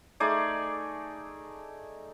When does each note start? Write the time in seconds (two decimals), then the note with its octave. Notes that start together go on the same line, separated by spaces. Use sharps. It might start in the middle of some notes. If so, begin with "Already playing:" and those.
0.20 A3 D#4 G#4 D5